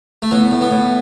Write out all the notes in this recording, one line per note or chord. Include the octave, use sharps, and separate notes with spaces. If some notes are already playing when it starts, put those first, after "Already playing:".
A3
A2 B3
A2
B3
A2